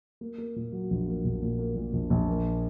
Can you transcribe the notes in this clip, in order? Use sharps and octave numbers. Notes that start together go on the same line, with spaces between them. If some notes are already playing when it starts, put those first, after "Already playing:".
A#3
A#3
A#2
F#3
A#1
A#3
A#1
A#2
A#3
A#2
A#1
A#1
A#3